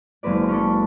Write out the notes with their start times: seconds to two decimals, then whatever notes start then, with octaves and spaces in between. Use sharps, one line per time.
0.23 F#1 G#3 C4 B4 D5
0.49 C#4 D4 A4